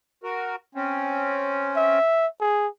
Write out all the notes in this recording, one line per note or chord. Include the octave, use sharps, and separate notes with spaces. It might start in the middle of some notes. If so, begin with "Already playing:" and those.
F#4 A#4
C4 C#4
E5
G#4